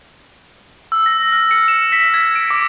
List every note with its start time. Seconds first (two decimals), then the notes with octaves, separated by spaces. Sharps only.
0.92 E6
1.06 A#6
1.32 F6
1.51 C#7
1.68 E7
1.92 B6
2.14 G#6
2.35 D7
2.50 D6